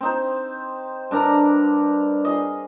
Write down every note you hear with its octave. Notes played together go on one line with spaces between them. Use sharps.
C4 D#4 C5
G2 D4 A#4 A#5
G#4 D#5